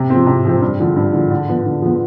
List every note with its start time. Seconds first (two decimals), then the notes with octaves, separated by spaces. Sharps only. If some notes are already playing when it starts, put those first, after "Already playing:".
Already playing: C3
0.10 F3 C4
0.27 C3
0.45 F3 C4
0.61 G2
0.80 D3 F3
0.96 G2
1.13 D3 F3
1.30 D3
1.49 F3 B3
1.66 D3
1.82 F3 B3